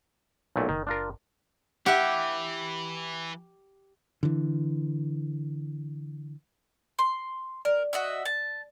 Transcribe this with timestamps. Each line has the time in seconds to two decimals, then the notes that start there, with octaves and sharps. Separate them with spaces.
0.56 B1 A#2 A3
0.69 F#1 D#3
0.87 D4 F4 A#4
1.86 E3 G4 E5 F#5
4.23 D3 E3
6.99 C6
7.65 A#4 D5
7.93 F#4 D#5 E5
8.25 A5